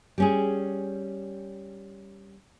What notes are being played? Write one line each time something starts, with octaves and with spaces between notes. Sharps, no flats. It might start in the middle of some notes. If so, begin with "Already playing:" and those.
G3 C#4 G#4